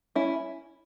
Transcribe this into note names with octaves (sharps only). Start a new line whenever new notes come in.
C#4 E4